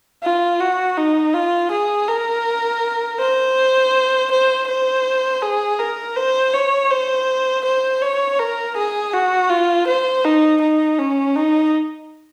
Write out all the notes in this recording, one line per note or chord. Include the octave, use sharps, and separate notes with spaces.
F4
F#4
D#4
F4
G#4
A#4
C5
C5
C5
G#4
A#4
C5
C#5
C5
C5
C#5
A#4
G#4
F#4
F4
C5
D#4
D#4
C#4
D#4